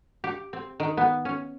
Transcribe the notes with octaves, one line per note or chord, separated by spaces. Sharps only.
G4
C4
D#3
B3
C#4